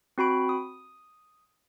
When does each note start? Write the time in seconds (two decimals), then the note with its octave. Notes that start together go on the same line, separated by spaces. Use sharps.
0.18 C4 F#4 B5 D7
0.49 D#6